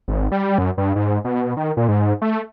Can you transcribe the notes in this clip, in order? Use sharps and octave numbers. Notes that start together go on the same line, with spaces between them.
G#1
G3
F#2
G2
G#2
B2
D#3
A#2
G#2
A3